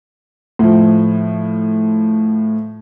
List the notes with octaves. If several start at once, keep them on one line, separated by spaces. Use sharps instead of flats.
A2 F3